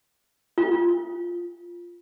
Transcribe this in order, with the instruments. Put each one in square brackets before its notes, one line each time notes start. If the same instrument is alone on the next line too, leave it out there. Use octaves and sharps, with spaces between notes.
[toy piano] F4